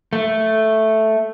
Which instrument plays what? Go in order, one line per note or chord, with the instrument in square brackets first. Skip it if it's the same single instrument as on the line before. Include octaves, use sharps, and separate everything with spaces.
[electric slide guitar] A3